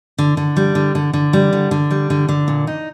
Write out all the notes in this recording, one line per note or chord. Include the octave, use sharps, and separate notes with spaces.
D3
D3
G3
D3
D3
D3
G3
D3
D3
G3
D3
D3
A#2
D#4